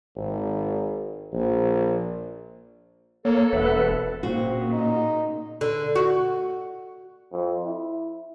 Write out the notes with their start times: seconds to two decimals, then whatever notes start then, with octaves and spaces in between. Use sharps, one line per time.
0.16 G#1
1.33 A#1
3.25 A#3 A4 C#5
3.53 E1 B4 E5 F#5
4.23 A#2 C#3 C4 F#4
4.73 D#4
5.61 D3
5.96 F#4
7.32 F2
7.65 E4